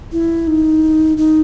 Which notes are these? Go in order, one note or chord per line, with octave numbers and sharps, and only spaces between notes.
E4
D#4
D#4